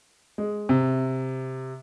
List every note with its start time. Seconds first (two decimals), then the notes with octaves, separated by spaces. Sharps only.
0.38 G#3
0.69 C3